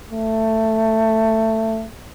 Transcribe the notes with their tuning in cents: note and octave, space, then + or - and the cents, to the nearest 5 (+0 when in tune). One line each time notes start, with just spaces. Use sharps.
A3 +15